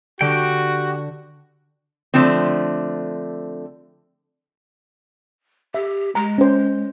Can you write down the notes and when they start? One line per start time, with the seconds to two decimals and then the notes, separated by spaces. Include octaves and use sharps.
0.21 D3 F#4 G4 G5
2.14 D3 F3 A3 C4
5.74 G4 E5
6.15 G#3 A#5
6.38 C#4 C5